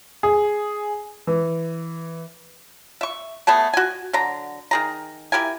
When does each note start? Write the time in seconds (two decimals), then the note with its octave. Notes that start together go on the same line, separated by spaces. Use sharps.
0.23 G#4
1.27 E3
3.01 E5 C#6
3.47 A3 B3 G#4 A5
3.74 F#4 G#5
4.13 D3 F#3 A#5
4.71 D#3 G#4 A#5
5.32 E4 G4 A#4 G#5